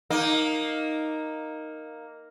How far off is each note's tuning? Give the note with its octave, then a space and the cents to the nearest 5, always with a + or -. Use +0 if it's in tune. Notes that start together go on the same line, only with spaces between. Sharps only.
A#3 +0 D#4 +0